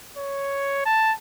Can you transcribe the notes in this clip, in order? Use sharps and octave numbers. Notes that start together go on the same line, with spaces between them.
C#5
A5